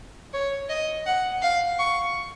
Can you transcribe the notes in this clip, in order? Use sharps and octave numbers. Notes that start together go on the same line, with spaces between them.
C#5
D#5
F#5
F5
C#6